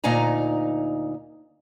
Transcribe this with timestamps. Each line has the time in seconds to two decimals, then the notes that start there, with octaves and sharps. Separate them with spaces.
0.04 D2 A#2 D#4 F5 G#5 A#5